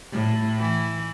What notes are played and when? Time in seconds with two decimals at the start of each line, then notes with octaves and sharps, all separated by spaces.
0.12 A2
0.59 E3